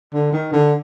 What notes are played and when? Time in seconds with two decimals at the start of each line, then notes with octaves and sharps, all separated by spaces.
0.13 D3
0.32 D#3
0.52 D3